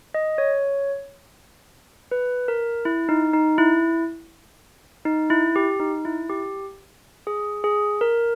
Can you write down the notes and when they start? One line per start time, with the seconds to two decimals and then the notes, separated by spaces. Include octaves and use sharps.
0.14 D#5
0.38 C#5
2.11 B4
2.48 A#4
2.85 E4
3.09 D#4
3.33 D#4
3.58 E4
5.05 D#4
5.30 E4
5.56 G4
5.80 D#4
6.05 E4
6.30 G4
7.27 G#4
7.64 G#4
8.01 A#4